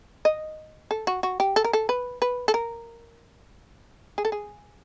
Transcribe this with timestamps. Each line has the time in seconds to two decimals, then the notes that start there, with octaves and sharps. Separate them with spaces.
0.25 D#5
0.91 A4
1.07 F#4
1.23 F#4
1.40 G4
1.56 A4
1.64 A#4
1.73 A4
1.89 B4
2.22 B4
2.48 A4
2.54 A#4
4.18 G#4
4.25 A4
4.32 G#4